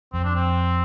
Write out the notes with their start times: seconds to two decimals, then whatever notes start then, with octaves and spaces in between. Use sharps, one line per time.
0.13 F2 C4
0.24 D4
0.35 C4